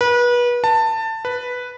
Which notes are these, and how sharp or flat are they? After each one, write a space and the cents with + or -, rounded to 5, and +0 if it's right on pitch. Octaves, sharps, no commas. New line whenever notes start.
B4 -30
A5 +20
B4 +0